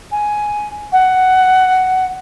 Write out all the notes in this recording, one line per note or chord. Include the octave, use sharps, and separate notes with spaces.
G#5
F#5